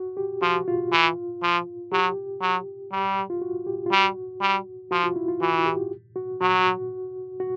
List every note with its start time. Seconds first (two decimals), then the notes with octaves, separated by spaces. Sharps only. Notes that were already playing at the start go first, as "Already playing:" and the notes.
Already playing: F#4
0.17 G4
0.42 F3 F#4
0.68 F4
0.92 E3
1.42 F3
1.92 F#3 G4
2.41 F#3
2.92 G3
3.30 F4
3.42 F#4
3.66 G4
3.86 F4
3.91 G3 F#4
4.41 G3
4.91 F3 F#4
5.04 F4
5.16 E4
5.28 F4
5.41 E3 F#4
5.66 G4
6.16 F#4
6.41 F#3 F#4
7.40 F#4